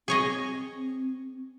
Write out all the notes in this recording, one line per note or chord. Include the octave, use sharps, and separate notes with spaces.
C4 G#4 C#5 D#5